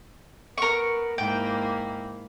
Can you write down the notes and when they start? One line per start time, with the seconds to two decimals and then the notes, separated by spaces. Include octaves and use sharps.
0.58 B3 A#4 C#6
1.18 G#2 A#3 E4 G5